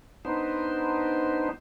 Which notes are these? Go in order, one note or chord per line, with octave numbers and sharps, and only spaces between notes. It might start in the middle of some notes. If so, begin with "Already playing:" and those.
B3 D4 D#4 C5